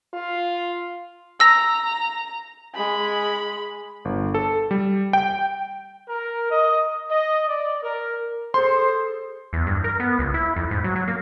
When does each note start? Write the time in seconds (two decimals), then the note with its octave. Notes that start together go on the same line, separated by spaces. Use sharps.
0.13 F4
1.40 A#5 E6 A#6
2.75 G#3 B5
4.05 G1
4.34 A4
4.71 G3
5.13 G5
6.09 A#4
6.50 D#5
7.09 D#5
7.48 D5
7.83 A#4
8.54 G#4 A4 C5 C6
9.53 E2
9.67 G2
9.84 A#4
10.00 B3
10.19 C#2
10.34 E4
10.56 F2
10.71 G#2
10.84 F#3
10.96 F#3
11.08 A#3